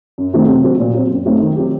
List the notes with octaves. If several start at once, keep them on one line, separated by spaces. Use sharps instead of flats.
F#2
D#3 F#3 A3 C4
C3
F#3 C4 F#4
A#2
F#3 C4
F#2
F#3 A3 C4 D#4
D#3
F#3 C4 G4